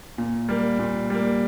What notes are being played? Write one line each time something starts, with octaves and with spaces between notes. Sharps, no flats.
A#2
G3 A#3
A#2
G3 A#3